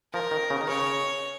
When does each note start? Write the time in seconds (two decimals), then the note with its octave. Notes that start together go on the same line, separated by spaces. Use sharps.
0.14 F3 A#4
0.31 D#3
0.50 C#3
0.61 D#3
0.68 C#3 C#5